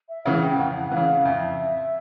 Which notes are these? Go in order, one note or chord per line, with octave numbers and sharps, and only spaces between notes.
E5
C#3 E3 F#5
G5
F2 F#5
C#3 E3 F5
F2 E5